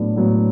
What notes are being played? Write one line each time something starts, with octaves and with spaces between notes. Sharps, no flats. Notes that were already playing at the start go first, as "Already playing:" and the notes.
Already playing: A2 F#3 B3 D4
A2 F#3 B3